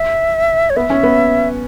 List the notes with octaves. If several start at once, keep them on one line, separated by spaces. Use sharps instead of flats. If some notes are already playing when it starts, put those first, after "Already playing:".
Already playing: E5
C#5
B3 E5
C#4
B3